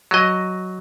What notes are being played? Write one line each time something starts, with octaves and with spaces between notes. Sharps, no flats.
F#3 D#5